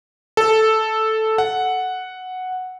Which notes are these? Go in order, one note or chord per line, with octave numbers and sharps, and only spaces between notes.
A4
F#5